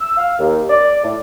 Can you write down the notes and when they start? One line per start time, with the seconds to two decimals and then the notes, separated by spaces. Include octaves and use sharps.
0.01 E6
0.17 F5
0.39 D#2
0.70 D5
1.04 A2